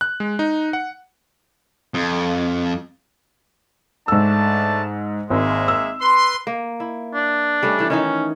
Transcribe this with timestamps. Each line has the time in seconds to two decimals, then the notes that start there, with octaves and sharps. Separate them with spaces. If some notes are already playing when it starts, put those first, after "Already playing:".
0.01 F#6
0.20 G#3
0.39 D#4
0.73 F#5
1.94 F2
4.08 G#2 A3 D4 A5 E6
5.30 G#1 G#3 A#3 E5
5.68 E6
6.01 B4 C6
6.47 A#3
6.80 E4
7.14 D4
7.63 G3 A3 C#4
7.79 E3 A4
7.90 D#3 E3 C#4 D#4